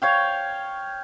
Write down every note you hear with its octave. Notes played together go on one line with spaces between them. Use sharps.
C#5 F5 G5